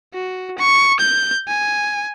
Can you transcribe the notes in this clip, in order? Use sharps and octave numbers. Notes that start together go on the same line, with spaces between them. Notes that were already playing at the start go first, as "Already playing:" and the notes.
F#4
C#6
G6
G#5